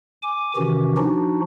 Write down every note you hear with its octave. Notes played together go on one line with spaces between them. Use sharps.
G#5 D6
C3 D#3 E3 C#4 F#4 G4
F3 D4 D#4 F#4